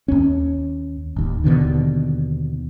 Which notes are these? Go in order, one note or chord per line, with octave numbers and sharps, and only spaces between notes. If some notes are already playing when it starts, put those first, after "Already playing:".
D#2 C#4
D1 D#2
D#2 B2 D3 D#3